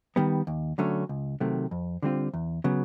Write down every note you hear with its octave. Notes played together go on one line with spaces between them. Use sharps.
D#3 G3 B3
D#2
D3 F#3 A3 C#4
C#2
C3 D#3 F#3 A3
F2
D3 G3 C4 F4
E2
C#3 F#3 B3